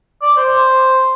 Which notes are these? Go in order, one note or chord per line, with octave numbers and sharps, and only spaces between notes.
D5
C5